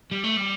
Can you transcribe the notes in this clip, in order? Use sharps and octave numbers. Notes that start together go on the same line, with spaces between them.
G3
A3
G3